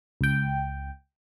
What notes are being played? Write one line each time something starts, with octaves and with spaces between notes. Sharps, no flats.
C#2 G5